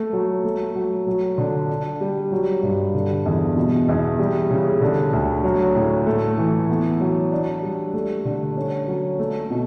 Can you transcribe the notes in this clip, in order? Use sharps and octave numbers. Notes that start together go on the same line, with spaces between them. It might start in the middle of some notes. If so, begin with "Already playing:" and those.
Already playing: A3
F#3
A3
F#3
F#3
D3
D4
G3
F#3
G2
D3
E2
B2
E2
G3
C#3
D3
D2
F#3
A2
A3
E3
B3
F#3
D4
G3
A3
D3
C#4
F#3
A3
B2